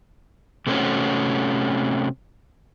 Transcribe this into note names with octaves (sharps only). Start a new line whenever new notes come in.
C3 A3 C4 C#4 F#4